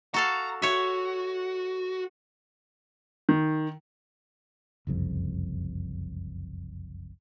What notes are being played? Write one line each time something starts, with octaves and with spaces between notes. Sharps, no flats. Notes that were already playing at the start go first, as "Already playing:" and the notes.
F#4 A4 F5 A#5
F#4 C#5 E5
D#3
F#1 C2 F2